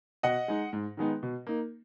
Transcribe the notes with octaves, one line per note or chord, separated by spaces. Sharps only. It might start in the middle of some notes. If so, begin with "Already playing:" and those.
B2 D#5 F#5
G#3 D#4
G#2
D#3 G#3 B3 D#4
B2
A#3 D#4